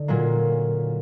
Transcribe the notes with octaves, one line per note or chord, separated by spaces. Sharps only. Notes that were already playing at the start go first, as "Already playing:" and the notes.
Already playing: D3 D#4
A#2 F#3 A#3